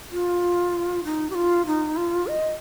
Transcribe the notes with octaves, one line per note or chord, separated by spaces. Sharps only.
F4
D#4
G4
F4
D#4
F4
D#5